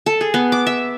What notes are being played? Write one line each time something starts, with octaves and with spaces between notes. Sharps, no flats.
A4
G#4
B3
D6
E5